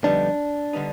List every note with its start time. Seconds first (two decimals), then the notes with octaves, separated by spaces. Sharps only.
0.04 F2 D3 G3 B3 D4 D#4
0.73 D3 G3 B3 D#4